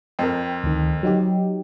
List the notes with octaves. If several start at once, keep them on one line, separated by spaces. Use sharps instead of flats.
F2 A#4 G5
D2 D#3
F#3 D#4 G4